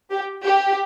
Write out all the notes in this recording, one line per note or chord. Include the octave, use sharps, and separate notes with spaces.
G4
G4